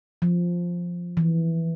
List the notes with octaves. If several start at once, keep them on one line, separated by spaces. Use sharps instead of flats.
F3
E3